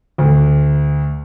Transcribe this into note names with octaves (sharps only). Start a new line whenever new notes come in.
D2